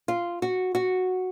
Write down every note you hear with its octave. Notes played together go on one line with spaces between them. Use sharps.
F4
F#4
F#4